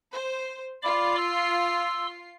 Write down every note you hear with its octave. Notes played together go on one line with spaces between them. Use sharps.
C5
F4 D5 B5 D6 C7
C6 E6